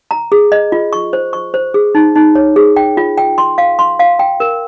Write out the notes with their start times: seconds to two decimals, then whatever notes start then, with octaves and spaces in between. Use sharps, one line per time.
0.11 A#5
0.32 G#4
0.52 D#5
0.72 F4
0.93 C#6
1.13 C5
1.33 C#6
1.54 C5
1.74 G#4
1.95 D#4
2.15 D#4
2.35 C#5
2.56 G#4
2.77 G5
2.97 F4
3.18 G5
3.38 C6
3.58 F5
3.79 C6
3.99 F5
4.19 G5
4.40 A#4